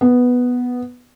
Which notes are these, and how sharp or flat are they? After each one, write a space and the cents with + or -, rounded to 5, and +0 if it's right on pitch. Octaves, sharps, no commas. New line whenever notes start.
B3 +0